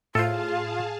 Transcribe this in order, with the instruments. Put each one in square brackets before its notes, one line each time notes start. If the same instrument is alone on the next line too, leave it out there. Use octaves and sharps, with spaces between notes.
[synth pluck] A2 [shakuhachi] F4 [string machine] G#4 F5 A5 [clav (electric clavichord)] A4 C5